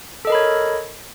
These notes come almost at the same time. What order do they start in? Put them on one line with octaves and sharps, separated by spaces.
A4 D#5 A#4 B5 C#5